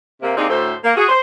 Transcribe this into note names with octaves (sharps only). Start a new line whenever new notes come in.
C3 A#3
C3 A#3 C4 D4 D#4 G#4
D2 A2 A3 A4 C5
A#3
F#4 G#4
C5